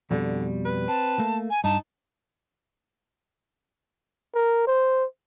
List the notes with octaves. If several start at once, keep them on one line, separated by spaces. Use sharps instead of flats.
F2 B2 D3 G3
B4
C4 A5
A3 A#3
G#5
G2 D#4 A5
A#4
C5